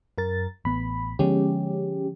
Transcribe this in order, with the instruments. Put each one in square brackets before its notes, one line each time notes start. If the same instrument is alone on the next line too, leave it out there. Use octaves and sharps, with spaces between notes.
[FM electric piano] F#2 A#4 A6
[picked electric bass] A1 B3 [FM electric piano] B5
[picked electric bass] D3 F3 B3 [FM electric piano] G#3 C#4 G4